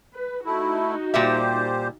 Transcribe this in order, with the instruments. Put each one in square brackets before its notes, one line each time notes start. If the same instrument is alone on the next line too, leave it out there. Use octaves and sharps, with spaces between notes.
[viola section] B4
[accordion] A3 E4 [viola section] D#4 F#4
[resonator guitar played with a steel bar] A#2 G3 E5 [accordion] G4 C5